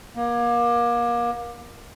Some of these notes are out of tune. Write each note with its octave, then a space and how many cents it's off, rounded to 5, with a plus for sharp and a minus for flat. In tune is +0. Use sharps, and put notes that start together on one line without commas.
A#3 +30